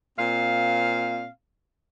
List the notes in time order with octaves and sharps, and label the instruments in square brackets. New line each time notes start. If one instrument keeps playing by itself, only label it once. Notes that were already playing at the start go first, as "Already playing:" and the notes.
[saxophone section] A#2 C4 F5